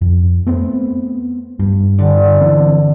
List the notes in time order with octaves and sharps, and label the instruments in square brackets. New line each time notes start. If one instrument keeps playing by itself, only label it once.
[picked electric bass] F2
A3 B3 C4
G2
[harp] D3
[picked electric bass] E3 C4